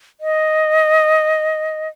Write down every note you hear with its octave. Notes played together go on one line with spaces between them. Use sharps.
D#5